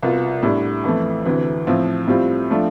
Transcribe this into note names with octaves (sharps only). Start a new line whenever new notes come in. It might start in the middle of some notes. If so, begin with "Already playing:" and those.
C2 B2 B3 F4
A2 G3 D4
F2 E3 A3
D2 C3 E3
A2 F3 C4 F4
A2 G3 C4 F4
F3 A3 D4 F4